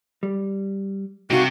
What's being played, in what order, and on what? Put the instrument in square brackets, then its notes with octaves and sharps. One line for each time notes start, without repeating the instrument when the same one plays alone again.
[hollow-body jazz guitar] G3
[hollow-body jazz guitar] C2 D#4 F5 [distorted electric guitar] C3 [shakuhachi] F#4